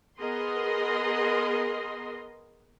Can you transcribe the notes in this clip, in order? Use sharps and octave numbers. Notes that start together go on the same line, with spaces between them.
B3 G#4 A#4 D#5 C6